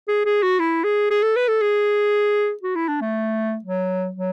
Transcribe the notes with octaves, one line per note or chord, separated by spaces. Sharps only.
G#4
G#4
F#4
E4
G#4
G#4
A4
B4
A4
G#4
F#4
E4
D4
A3
F#3
F#3